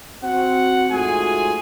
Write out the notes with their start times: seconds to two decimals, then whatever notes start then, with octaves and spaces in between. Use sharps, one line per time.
0.23 C4 F#4 F#5
0.91 G#2 A3 F4 F#4 G#4 G#5